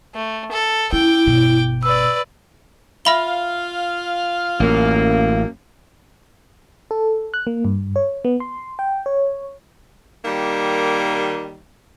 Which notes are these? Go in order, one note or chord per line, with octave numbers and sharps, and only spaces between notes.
A3
A4
C#4 E4 G5 D6
G1 B2
B4 D5 E6
F4 E5 F5 B5 G7
A1 F#2 A2 A#3
A4
F#6
A#3
G2
C#5
B3
C6
G5
C#5
D#3 G3 A#3